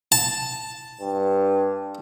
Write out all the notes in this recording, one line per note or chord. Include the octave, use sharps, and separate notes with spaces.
A5
G2